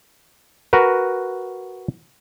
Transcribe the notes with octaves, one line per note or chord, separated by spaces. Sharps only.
F#4 A#4 B4